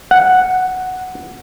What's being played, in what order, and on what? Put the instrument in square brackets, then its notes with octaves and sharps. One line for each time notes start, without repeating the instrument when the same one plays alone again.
[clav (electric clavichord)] F#5